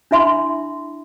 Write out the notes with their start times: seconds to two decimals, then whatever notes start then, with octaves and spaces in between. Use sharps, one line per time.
0.11 D4 E4 E5 B5 C6